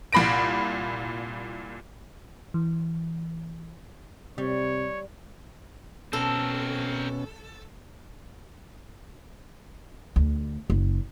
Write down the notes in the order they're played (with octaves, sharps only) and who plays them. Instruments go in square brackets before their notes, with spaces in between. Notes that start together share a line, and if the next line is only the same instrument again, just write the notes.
[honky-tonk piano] C2 A#2 B5 A#6 D7
[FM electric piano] E3
[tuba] C3 [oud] G3 [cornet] C#5
[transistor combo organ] B2 C#4 [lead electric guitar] C4 A#4 [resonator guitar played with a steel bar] A4
[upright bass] D2
F#1